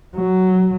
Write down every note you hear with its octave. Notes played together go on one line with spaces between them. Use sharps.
F#3